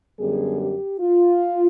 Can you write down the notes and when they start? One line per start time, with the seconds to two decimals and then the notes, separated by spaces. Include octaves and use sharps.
0.18 F#2 D3 G3 B3 G#4
0.59 G4
0.99 F4